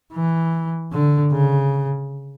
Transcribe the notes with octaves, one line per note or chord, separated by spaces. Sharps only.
E3
D3
C#3